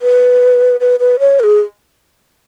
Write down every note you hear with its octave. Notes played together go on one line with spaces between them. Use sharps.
B4
B4
B4
C#5
A#4
G#4